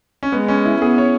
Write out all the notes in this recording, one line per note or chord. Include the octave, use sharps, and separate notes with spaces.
C#4
G#3 B3
C#4
E4
B3 G#4
C#5